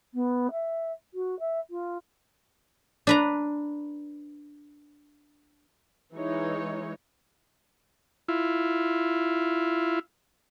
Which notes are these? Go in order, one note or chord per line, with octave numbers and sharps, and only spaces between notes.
B3
E5
F#4
E5
F4
D4 B4 A#5
E3 G#3 D#4 C#5
E4 F4